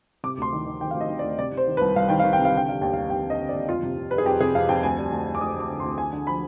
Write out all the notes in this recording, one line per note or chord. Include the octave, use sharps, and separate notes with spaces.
C3 D6
D2 C6
D#3
D#3
D#3 G5
D2 F5
D#5
D#3
D5
D2
C3 D5
C3
C5
D#3
B4
C2
C2 F5
D#3 G5
D#3 F5
G5
C3
F5
D3 G5
G3 F5
D#2 G5
F5
G3
D#2 G5
D3 D#5
D3
D5
D#2
F2 F4
C3
C3
G3 B4
G#4
F2 G4
C3 G#4
F2 F5
F2 G5
D2 G#5
G3
D2
D2
D6
D2 D#6
D2 D6
D3
C6
D2
D3 G#5
D3
F3 B5